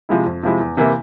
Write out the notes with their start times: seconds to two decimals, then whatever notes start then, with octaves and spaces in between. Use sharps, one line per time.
0.09 C3 F3 G#3 E4
0.26 F2
0.43 C3 F3 G#3 E4
0.60 E2
0.77 C3 E3 A#3 E4